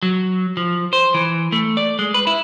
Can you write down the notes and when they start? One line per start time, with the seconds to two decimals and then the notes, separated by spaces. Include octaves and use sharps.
0.03 F#3
0.57 F3
0.93 C5
1.14 E3
1.52 A3
1.77 D5
1.99 G#3
2.14 B4
2.27 E4